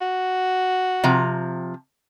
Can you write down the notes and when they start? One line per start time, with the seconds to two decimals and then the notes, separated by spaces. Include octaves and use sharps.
0.01 F#4
1.04 C3 F3 A#5